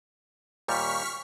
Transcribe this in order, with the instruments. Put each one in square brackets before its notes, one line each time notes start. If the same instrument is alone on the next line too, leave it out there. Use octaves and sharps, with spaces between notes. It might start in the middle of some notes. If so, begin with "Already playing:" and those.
[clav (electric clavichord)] D#2 A#2 G3 [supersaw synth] C#6 F6 B6